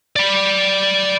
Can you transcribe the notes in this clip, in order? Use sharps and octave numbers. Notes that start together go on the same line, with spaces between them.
D5 B5